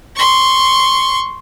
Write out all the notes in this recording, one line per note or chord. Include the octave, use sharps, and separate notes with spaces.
C6 C#6